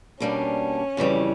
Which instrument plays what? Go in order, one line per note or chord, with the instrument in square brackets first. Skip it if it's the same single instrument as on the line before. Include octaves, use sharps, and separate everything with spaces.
[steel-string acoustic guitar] B2 G3 A#3 D4 [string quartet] C#4
[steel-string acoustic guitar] F2 C#3 E3 G3